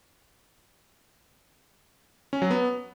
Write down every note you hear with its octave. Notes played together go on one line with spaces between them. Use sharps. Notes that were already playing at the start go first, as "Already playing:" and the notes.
C#4
F#3
B3